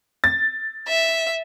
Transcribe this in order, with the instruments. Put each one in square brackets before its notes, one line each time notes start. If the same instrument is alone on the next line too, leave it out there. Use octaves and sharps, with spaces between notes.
[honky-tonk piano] A6
[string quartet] E5